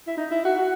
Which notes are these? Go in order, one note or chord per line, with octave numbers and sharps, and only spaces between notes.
E4
D#4
E4
F#4
F#4